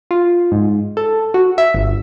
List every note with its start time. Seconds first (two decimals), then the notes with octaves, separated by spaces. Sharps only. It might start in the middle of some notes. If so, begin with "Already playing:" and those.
0.11 F4
0.51 G#2
0.97 A4
1.34 F#4
1.58 E5
1.74 G1